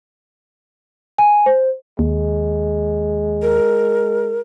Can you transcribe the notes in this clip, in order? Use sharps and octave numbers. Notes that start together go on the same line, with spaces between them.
G#5
C5
D#2 G#3
A#4